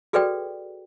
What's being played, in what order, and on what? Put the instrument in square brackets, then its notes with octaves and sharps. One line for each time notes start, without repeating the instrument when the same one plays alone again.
[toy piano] F#4 G#4 A4 B4 D5 G5